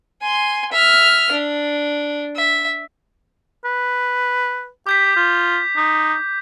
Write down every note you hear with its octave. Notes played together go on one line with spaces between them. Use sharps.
G#5 C6
E5 F6
D4
E5
B4
G4 D6 G6 B6
F4
D#4